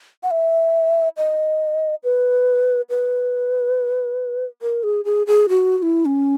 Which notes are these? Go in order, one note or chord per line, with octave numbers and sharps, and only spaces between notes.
F#5
E5
D#5
B4
B4
A#4
G#4
G#4
G#4
F#4
F#4
E4
C#4